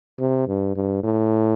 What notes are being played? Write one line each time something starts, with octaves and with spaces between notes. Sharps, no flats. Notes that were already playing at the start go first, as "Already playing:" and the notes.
C3
G2
G2
A2